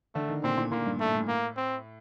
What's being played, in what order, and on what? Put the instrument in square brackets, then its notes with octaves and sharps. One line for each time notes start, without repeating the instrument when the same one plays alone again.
[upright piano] D3 [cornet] A3
[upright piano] D#3
[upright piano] A#2 [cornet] C4
[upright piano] A#2
[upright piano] A#2 [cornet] A#3
[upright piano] G2
[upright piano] A2 [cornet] A3
[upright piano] A2
[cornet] A#3
C4